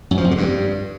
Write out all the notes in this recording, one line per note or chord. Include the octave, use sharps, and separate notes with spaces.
F#2
F3
F2
D3
G2